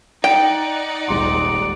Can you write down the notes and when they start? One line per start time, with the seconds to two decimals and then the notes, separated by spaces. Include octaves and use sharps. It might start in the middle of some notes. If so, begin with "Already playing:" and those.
0.24 D#4 D5 F#5 G5
1.08 D#1 G#1 G#4 C6 D6